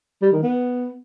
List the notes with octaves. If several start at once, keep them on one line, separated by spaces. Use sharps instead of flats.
G3
D#3
B3